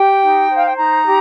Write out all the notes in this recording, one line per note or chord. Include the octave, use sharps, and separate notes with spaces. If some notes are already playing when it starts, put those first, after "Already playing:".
Already playing: G4 G5
D#4
C5
F5
G5
D#4 A#5
G4